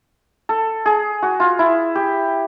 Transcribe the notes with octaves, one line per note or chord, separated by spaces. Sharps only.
A4
G#4
F#4
F4
E4
G4